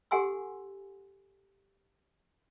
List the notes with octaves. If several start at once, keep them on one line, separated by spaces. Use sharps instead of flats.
G4 A4 F#5 G#5 C6 E6